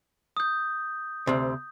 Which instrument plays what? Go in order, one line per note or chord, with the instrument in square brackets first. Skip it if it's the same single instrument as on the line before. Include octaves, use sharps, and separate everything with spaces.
[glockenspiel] D#6 G6
[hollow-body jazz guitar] D2 C3